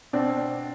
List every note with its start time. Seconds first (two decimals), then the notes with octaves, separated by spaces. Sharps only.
0.13 B2 C4 D4